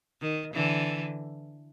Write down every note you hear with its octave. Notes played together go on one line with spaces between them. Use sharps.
D#3
D3 E3